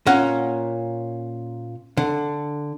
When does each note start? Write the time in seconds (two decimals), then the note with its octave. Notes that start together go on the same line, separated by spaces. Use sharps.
0.06 A#2 A#3 C#4 F#5
1.97 D3